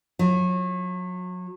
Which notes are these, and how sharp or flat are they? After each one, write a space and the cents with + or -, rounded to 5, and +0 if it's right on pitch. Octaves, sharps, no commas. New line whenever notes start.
F#3 -30 F4 -30